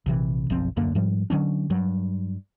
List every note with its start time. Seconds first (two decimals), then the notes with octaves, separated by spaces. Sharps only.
0.06 A#1 C3 E3
0.50 F#1 B1 F3 C4
0.76 D1 F#2 D3 A#3
0.95 G#2 F3 G3
1.30 D3 F#3 C#4 D4
1.70 G2 F#3